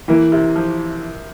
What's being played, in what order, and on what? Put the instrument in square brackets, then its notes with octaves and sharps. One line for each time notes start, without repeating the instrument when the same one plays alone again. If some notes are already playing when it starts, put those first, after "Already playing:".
[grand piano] E3 [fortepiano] A#3
[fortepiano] C3
F3